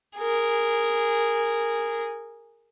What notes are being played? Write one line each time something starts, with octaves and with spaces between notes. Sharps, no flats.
G#4 A#4